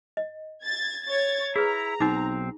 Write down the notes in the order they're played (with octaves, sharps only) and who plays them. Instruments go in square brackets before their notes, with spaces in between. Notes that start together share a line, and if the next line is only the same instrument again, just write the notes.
[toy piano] D#5
[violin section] G#6 A6
C#5 G#6 A6
[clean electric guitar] E4 [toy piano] G#4 B4 [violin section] A#5
[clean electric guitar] B1 C4 [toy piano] D#4 D6